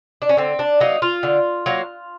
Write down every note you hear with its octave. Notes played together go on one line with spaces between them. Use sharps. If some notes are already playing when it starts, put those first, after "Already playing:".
D4
C#4
D3 C4
D4
F#3 A#3 D#4
F4
D3
F#3 A#3